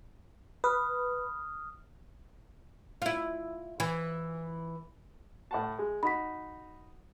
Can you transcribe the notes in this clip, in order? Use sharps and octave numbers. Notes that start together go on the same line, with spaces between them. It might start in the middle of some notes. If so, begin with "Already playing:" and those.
B4 D#6 F6
E4 F4
E3
A2 F#5 A5
G#3
D#4 F#4 B5 B6